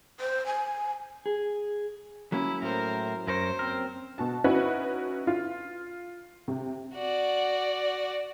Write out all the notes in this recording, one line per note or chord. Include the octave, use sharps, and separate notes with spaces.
C5
G#5
G#4
F#3 A#3 C#4 E4
A2 A#4 C5
F#2 A#4 C5 C#5
C4 A#4
B2 F#4 A5
C#4 D#4 E4 F#4 B4
F4
C3
F#4 D5